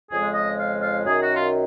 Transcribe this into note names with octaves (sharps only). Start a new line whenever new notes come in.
F2 C#3 F3 G#3 G#4
D#5
F5
F5
F#2 D#3 F#3 G#4
F#4
F4